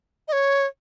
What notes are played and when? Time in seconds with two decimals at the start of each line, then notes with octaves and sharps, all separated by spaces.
0.28 D#5
0.33 C#5